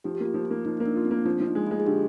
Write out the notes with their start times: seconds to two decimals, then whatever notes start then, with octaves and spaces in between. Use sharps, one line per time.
0.04 F3 G4
0.15 G4
0.20 A#3
0.25 F4
0.34 F3
0.45 F4
0.51 A#3
0.65 F3 D#4
0.77 D#4
0.80 A#3
0.86 D4
0.96 F4
1.05 C4
1.11 A#3
1.25 F3 D4
1.40 F3
1.46 D#4
1.55 G#3
1.66 G#3 F4
1.80 G#4
1.86 D3 G4